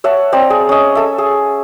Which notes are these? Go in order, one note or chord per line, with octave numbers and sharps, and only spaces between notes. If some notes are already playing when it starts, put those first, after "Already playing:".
C#5 E5 F#5 A5
C4 D5 A#5
G#4
C#4 D#5
A4 E5
G#4